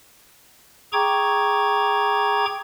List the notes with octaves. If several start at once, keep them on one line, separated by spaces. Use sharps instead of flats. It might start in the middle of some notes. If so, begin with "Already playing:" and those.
G#4 G5 A#5 C#6 D6 G#6